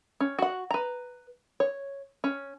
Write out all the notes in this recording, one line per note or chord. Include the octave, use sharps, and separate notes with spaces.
C#4
F#4 F#5
B4 A#5
C#5
C#4